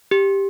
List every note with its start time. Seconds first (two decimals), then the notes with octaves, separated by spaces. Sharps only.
0.11 G4